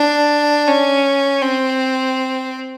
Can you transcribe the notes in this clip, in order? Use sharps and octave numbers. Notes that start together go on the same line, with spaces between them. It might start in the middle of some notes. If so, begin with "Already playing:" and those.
Already playing: D4
C#4
C4